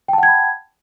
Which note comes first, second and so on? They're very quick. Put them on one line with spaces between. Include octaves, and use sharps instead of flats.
G5 A5 F#5 G#6 B5